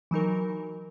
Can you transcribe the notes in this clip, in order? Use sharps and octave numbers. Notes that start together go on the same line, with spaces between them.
E3 F#3 D#4 A#4